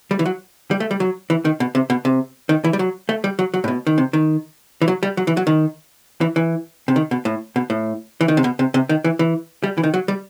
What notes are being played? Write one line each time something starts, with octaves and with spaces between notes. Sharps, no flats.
G3
E3
F#3
G3
A3
G3
F#3
E3
D#3
B2
C3
B2
C3
D#3
E3
G3
F#3
A3
G3
F#3
F#3
A2
B2
D#3
C3
D#3
E3
F#3
G3
F#3
E3
F#3
D#3
E3
E3
C3
D#3
B2
A2
B2
A2
E3
D#3
C3
B2
C3
C3
D#3
E3
E3
G3
E3
D#3
F#3
G3